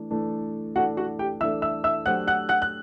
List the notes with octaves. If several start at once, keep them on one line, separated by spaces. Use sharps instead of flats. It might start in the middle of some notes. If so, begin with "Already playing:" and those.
Already playing: E3 A3 D4
E3 A3 D4 A4
E3 A3 D4 F#4 A4 F#5
F#4 F#5
G4 G5
E3 A3 D4 A4 E5 E6
E5 E6
E5 E6
F#3 A3 D4 G4 C5 F#5 F#6
F#5 F#6
F#5 F#6
F#6